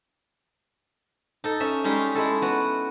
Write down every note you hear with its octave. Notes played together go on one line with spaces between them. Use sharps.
D#4 A4
C#4 E5
G3 G#3 C#4 D#4
G#3 E4 A4
B3 F#4